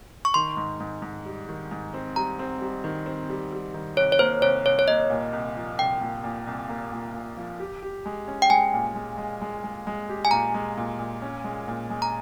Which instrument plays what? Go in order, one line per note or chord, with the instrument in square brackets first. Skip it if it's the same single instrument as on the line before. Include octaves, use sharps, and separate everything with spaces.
[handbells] C#6
[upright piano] D#3 [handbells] C6
[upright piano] G#2
G#2
G#2
G3
D#3
G#2
C4
[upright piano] G3 [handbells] A#5
[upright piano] C4
G3
D#3
C4
G3
G3
D#3
[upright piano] C2 [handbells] C#5
[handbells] C#5
[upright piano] A#3 [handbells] C5
[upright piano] C2 [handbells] C#5
[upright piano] C2 [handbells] C#5
[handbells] C#5
[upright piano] A#3 [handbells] D#5
[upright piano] A#2
C2
F3
[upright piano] C2 [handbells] G5
[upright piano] A#2
A#2
C2
A#3
A#2
A#2
F3
G4
G4
G#3
C#4
[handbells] G5
[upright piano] G#3 [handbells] G#5
[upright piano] A#2
G#3
G#3
G#3
G#3
G#3
G4
[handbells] G#5
[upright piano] A#2 [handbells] A#5
[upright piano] G#3
A#2
A#2
C#4
G#3
A#2
G#3
[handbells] A#5